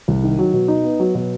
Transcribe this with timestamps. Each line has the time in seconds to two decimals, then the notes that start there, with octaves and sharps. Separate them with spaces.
0.08 C2
0.23 D#3
0.39 F#3
0.53 B2
0.68 D#4
0.84 B3
1.00 F#3
1.15 B2